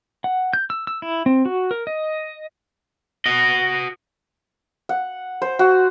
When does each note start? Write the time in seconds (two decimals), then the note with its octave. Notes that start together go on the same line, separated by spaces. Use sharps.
0.24 F#5
0.53 G6
0.70 E6
0.87 E6
1.02 E4
1.26 C4
1.46 F#4
1.71 A#4
1.87 D#5
3.26 F#4 D#5
4.89 F#5
5.42 C5
5.59 F#4